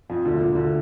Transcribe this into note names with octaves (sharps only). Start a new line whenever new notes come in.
F2 F3
D2 D3
A#2
D2 D3